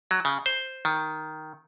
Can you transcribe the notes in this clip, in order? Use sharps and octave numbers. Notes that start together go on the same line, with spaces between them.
F#3
C#3
C5
D#3